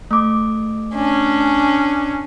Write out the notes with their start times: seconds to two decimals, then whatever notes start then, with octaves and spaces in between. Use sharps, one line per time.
0.11 A3 D6
0.95 C#4 D4